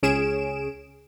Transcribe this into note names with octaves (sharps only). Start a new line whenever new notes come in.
C#2 C#4 G#4 D7 E7